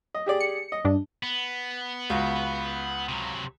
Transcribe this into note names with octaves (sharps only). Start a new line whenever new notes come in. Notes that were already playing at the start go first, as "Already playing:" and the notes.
D#5
G4 G#4 D5
C#7
D#5
G2 D4
B3
C#2 F#4
C3 F#3